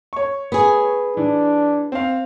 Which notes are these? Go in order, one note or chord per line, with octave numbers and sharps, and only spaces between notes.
C#5 C#6
B3 G#4
E3 D4
C4 F5